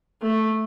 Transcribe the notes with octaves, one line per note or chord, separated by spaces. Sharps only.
A3